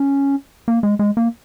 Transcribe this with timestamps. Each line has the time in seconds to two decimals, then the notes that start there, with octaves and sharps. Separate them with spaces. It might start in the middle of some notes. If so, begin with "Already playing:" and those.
Already playing: C#4
0.68 A#3
0.83 G#3
0.99 G#3
1.17 A#3